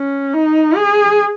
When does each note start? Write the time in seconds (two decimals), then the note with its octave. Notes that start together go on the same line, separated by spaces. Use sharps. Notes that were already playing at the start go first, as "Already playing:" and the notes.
Already playing: C#4
0.34 D#4
0.76 G#4